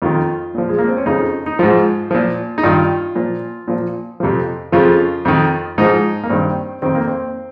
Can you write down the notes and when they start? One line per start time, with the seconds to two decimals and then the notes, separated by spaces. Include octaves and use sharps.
0.02 F2 D#3 F4
0.55 A#2 F3
0.69 G#3
0.78 A#3
0.88 C4
0.97 C#4
1.06 F2 C#3 F3 D#4
1.46 D#4
1.59 G#2 F3 F4
2.11 A#2 F3
2.58 D#4
2.64 G2 D#3 F4
3.16 A#2 F3
3.68 A#2 F3
4.20 F2 C3 F3
4.72 F2 C#3 F3 F4
5.25 F2 D#3
5.78 G#2 F3 D#4
6.24 A#3
6.29 G2 D#3 C4
6.82 F2 D#3 C4
6.95 A#3
7.07 C4